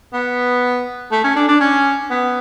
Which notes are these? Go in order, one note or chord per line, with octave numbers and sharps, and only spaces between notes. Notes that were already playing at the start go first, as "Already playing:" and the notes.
B3
A3
C#4
D4
D4
C#4
B3